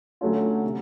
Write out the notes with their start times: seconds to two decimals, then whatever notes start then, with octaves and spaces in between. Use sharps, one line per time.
0.21 D3 F#3 A3 C#4 F4
0.64 C3